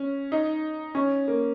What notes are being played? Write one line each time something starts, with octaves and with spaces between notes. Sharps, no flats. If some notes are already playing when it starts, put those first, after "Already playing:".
Already playing: C#4
D#4
C#4
A#3